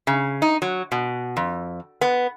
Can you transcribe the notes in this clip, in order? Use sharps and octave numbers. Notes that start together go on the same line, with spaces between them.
C#3
D#4
F#3
B2
F2
B3